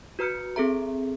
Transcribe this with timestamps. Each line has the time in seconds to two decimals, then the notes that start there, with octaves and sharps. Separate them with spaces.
0.19 F#4 B4 A#5 F6 G6 C#7
0.56 C4 G#4 A4 E5 A#5